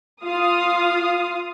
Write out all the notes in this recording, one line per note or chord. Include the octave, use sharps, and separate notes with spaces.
F4 F5 D#6